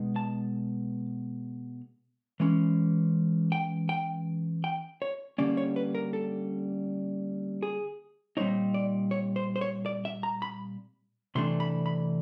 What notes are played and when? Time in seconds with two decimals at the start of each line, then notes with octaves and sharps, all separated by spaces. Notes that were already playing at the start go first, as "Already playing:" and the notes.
Already playing: B2 G#3 B3 D#4
0.16 A5
2.40 E3 G#3 C#4
3.52 G5
3.89 G5
4.64 G5
5.02 C#5
5.38 D3 G3 A#3 C#4 D5
5.57 C#5
5.76 B4
5.95 A#4
6.13 A4
7.63 G#4
8.37 A#2 G3 C4 D#4 C#5
8.74 D5
9.11 C#5
9.36 C5
9.56 C5
9.61 C#5
9.86 D5
10.05 E5
10.23 A#5
10.42 B5
11.35 C3 E3 A3 D4 C6
11.60 B5
11.86 B5